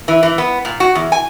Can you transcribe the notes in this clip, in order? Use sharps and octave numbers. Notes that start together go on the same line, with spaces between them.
E3
E3
B3
A#2
F#4
E2
G#5